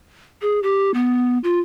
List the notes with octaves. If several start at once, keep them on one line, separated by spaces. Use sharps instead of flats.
G#4
G4
B3
F4